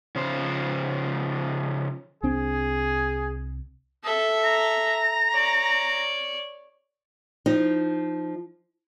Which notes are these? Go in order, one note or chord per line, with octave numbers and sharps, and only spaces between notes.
C#3 F3 C5
C2 C4 D4 G#4
A4 E5
A#5
C#5 D5
F3 D#4